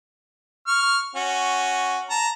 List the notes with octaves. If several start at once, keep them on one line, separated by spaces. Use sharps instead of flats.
C#6 F6
C#4 F#4
A5 A#5